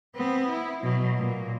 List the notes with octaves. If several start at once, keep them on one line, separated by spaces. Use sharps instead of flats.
B3 C4
E4
B2 F#3
A#2